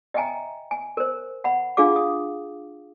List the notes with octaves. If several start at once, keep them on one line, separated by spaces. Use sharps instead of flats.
D#5 E5 G5 G#5 A#5
G#5
A#4 C5
F#5 B5
D4 F4 G#4 F5 D6
D#6